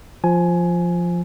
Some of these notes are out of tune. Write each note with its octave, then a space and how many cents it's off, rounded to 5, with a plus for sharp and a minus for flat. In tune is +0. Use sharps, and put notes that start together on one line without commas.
F3 +0 G#5 +15